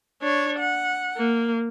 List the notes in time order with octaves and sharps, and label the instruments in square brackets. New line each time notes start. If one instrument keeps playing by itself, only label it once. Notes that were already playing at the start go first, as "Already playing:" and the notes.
[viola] D4 C#5
F#5
A#3